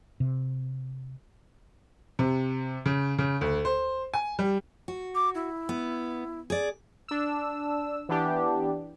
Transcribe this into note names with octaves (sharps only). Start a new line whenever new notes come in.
C3
C3
C#3
C#3
D2
C5
G#5
G3
F#4
D6
E4
B3
G#4 D5
D4 E6
E3 B3 D4 G4